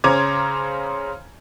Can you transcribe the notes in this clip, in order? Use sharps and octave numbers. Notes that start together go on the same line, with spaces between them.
C#3 C#4 C5 A#5 D6 G#6